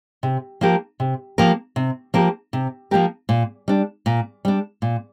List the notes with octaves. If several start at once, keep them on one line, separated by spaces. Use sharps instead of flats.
C3
F3 A#3 G4 A#4
C3
F3 A#3 G4 A#4
C3
F3 A#3 G4 A#4
C3
F3 A#3 G4 A#4
A#2
G3 D4
A#2
G3 D4
A#2